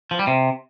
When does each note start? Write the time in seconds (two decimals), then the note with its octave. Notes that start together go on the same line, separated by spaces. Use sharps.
0.11 F3
0.19 G3
0.27 C3